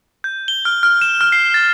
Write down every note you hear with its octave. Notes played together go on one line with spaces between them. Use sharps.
G6
G7
F6
F6
E7
F6
C7
A6